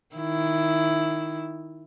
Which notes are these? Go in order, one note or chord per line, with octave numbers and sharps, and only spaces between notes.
D#3 E4